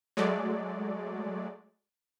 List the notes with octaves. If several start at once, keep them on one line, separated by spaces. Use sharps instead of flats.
F#3 G#3 A3 D5